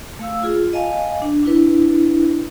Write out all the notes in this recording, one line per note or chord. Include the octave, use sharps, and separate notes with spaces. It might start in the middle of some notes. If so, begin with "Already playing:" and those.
A3 F5 E6
F4 G#4
D#5 F5 G#5 A5
D4
D4 E4 B4